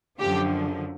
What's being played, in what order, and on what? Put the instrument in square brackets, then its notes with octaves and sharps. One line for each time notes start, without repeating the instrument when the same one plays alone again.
[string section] F#2 D3 F3 G4